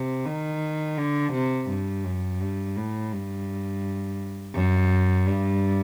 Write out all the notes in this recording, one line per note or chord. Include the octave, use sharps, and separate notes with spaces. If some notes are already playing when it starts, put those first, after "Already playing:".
Already playing: C3
D#3
D3
C3
G2
F#2
G2
A2
G2
F#2
G2